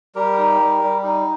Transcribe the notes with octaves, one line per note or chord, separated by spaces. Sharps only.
G3 G4 A#4
D#4
G3
G3
D#4